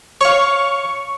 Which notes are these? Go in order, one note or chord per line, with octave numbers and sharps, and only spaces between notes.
C#5 F5 C#6